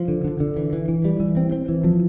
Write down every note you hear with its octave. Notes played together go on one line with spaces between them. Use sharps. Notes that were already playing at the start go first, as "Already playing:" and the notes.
Already playing: F3
D3
D3
D3
E3
E3
E3
G3
E3
C4
C4
E3
F3